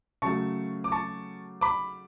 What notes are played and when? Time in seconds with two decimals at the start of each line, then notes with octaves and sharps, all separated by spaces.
0.22 C#3 F#3 A3 A5 C#6
0.84 D6
0.92 A5 C#6
1.61 B5 D6